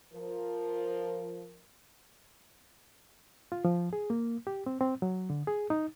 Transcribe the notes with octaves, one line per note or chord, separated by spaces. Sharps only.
F3 A#4
F4
F3
G#4
A#3
G4
C4
C4
F#3
D3
G#4
D#4